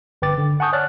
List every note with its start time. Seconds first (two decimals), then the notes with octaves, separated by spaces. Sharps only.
0.22 G1 B4 G5 D6 A6
0.38 D3
0.60 F#5 G#5 A5 C#6 D#6 G6
0.73 C#5 D5 A5 F6 F#6 A6